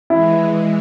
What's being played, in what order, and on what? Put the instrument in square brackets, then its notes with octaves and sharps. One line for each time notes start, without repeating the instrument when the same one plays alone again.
[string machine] E3 G#3 [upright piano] E4